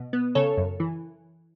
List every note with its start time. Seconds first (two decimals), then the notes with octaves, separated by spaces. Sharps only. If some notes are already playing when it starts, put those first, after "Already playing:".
Already playing: B2
0.13 B3
0.35 C#3 A4 C#5
0.57 F#2
0.80 E3